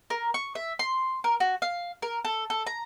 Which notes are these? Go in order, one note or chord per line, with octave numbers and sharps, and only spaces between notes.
A#4
C#6
E5
C6
A#4
F#4
F5
A#4
A4
A4
A#5